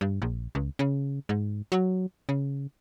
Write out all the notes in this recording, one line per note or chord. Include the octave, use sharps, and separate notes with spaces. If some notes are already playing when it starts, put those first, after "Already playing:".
G2
A#1
C#2
C#3
G#2
F#3
C#3